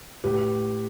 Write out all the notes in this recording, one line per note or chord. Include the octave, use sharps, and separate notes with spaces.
A2 G4 B4